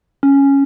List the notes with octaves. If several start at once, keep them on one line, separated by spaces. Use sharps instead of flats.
C#4